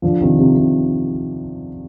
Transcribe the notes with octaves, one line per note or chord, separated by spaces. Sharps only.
D3 F3
C3 D#3
C3
C3